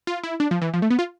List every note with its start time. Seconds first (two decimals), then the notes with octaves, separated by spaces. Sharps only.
0.07 F4
0.24 E4
0.40 D4
0.51 F3
0.62 E3
0.74 F3
0.82 A3
0.91 B3
0.99 F4